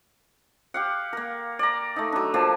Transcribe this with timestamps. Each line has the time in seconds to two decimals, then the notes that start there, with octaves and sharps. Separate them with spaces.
0.74 G4 F5 F#5
1.13 A#3 A#4
1.59 D5 A#5
1.96 A3 D#4
2.12 F#3 D4
2.34 F3 A#3 D4 G4